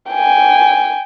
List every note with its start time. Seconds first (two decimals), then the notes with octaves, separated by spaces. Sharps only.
0.11 G5 G#5